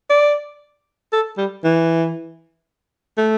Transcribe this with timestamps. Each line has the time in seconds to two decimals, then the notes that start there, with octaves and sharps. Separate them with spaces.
0.10 D5
1.13 A4
1.38 G3
1.64 E3
3.18 A3